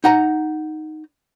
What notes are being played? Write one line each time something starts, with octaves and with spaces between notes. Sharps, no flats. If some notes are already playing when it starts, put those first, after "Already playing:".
D#4 F#5 A#5